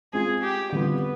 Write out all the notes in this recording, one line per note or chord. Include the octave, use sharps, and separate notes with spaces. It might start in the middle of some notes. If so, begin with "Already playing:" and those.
G#3 C4 F4 G#4
G4
D3 G3 B3 C4 F4